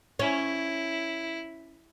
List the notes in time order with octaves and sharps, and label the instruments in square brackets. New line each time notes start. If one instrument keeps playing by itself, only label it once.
[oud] C#4 [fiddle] E4